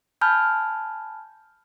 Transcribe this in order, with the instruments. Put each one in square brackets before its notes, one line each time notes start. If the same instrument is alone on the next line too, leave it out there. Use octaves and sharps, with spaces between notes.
[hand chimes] G#5 A5 B5 F6 G6